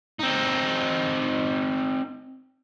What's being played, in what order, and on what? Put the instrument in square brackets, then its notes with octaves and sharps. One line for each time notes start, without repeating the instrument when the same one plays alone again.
[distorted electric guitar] C4 D#4